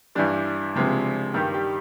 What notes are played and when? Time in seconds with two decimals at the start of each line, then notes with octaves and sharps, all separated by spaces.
0.15 G2 E3 G3 D4
0.75 C#2 C3 F3 G#3
1.34 G2 D#3 G3 G4
1.54 G4